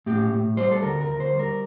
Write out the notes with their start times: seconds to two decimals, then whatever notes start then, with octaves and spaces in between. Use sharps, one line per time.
0.06 A2 G4
0.32 A2
0.57 G3 C5
0.72 A4
0.82 D2 A#4
1.01 A#4
1.08 D2
1.20 C5
1.33 G3
1.39 A#4